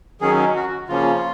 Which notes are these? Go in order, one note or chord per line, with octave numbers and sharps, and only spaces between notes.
D#3 F#3 C#4 G#4
F#4
C#3 F3 A#3 C#4 F4